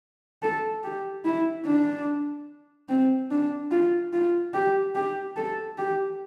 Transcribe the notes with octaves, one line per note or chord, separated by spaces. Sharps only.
A4
G4
E4
D4
C4
D4
F4
F4
G4
G4
A4
G4